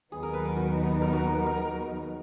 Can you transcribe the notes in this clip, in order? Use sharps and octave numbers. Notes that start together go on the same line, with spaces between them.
D#2 D#3 F#3 B3 D#4 G#4
A#4
B4
A#4
F#4
A#4
F#4
A#4
A#4
A#4